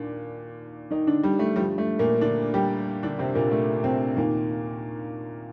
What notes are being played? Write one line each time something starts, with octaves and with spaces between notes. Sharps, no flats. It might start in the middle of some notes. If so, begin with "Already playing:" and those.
Already playing: D#2 A#2 D4
D#3 D#4
D3 D4
G3
A3
G2 D3 F3 G3
A3
A#2 A#3
D3 D4
G3 G4
D3 D4
C3 C4
A#2 A#3
A3
C3 C4
D#2 A#2 D#3 A#3